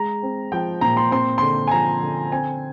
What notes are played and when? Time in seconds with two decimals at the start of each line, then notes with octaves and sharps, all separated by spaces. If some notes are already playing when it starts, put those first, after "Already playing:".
Already playing: G#3 A#5
0.23 C4
0.52 F3 G5
0.81 A#2 A#5
0.97 C6
1.11 C4 C6
1.38 D3 C6
1.67 G#5
1.71 F3 A#5
2.02 D3
2.32 C4 G#5